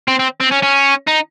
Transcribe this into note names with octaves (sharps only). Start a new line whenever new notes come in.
C4
C4
C4
C#4
C#4
D#4